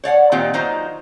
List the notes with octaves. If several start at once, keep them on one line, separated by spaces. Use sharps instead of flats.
C#5 D5 F5 F#5
A#2 D#3 C4 F4 G4
D#3 F#3 D#4 F4 C5 A#5